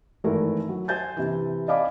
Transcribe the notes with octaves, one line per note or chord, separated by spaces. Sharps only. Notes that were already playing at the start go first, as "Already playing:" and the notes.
G#1 E3 A3 A#4
F#3
C5 G#5 G6 A6
C3 E3
D5 D#5 F5 G#5 B5 D6